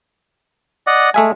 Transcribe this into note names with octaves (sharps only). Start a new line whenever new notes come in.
D5 D#5 F#5
G#3 A3 E5 G#5